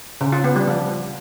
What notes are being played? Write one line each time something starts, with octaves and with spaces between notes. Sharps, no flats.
C#3
F4
B3
G3
F3